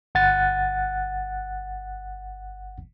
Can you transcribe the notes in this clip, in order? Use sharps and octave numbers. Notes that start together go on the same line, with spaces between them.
G1 F#5 F#6 A6